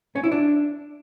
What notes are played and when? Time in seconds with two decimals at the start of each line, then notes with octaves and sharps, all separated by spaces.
0.15 C#4
0.24 E4
0.32 D4